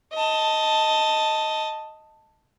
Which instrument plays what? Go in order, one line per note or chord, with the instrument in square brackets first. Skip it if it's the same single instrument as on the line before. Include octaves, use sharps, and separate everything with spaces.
[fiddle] D#5 A5